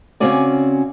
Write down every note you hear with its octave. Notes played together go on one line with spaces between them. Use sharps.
C#3 C4 C#4 F#4 D5 G#5